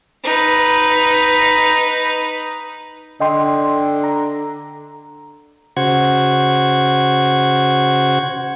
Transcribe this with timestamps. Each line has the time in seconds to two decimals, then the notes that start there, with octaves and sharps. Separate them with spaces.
0.24 D#4 B4
3.20 D3 D#5 G5 C6
4.04 A#5
5.77 C#3 F#4 C5 F#5 G#6